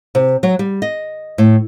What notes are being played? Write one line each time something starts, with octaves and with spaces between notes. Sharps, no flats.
C3
F#3
G3
D#5
A2